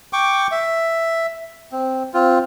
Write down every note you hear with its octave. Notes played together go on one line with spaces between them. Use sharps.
G5 C#6 D6
E5
C4
C4 F4